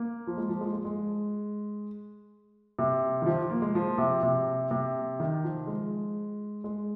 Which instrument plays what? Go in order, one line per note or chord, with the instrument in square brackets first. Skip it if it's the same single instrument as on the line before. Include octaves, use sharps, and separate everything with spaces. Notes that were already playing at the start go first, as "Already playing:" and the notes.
Already playing: [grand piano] A#3
F3
G#3
F3
G#3
G#3
G#3
C3
D#3
F3
A#3
G#3
F3
C3
C3
C3
D#3
F3
G#3
G#3